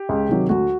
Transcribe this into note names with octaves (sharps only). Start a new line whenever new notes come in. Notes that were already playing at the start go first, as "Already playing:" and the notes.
Already playing: G4
C#2
C3 D#3 F#3
D2 F#4